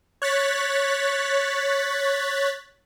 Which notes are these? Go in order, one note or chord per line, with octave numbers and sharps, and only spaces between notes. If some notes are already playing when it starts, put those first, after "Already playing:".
C#5 F#6 A6 B6